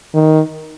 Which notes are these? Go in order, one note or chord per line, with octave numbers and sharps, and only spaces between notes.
D#3